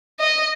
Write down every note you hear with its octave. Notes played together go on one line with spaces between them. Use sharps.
D#5